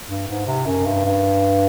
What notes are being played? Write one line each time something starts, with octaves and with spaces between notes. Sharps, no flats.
G2
G#2
C3
F#2
G2
G2